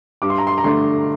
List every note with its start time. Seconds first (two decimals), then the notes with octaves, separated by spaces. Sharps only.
0.22 G2 D6
0.30 C6
0.38 A#5
0.47 C6
0.58 A#5
0.64 D3 A3 D4 C6